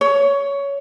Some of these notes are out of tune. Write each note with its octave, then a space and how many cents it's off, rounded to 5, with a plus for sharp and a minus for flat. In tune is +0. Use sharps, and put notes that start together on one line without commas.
C#5 +15